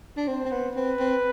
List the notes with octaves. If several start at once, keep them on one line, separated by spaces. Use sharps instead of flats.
D4
C4 C5
C4
B3
C4 B4
C4